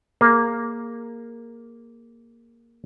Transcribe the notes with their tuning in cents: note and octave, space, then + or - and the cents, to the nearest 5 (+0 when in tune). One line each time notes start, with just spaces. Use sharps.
A#3 +0 G#4 +0